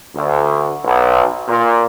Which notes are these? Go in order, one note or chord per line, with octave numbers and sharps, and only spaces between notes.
D2
B1
A#2